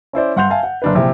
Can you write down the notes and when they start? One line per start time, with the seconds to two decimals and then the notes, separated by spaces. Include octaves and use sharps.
0.13 C#4 E4 C5 D5
0.36 G2 F#5 C6 G6 F7
0.50 E5 F5 G#5 A5
0.63 F#5
0.82 F#1 D4 B4
0.95 A#1 C3 E4 E5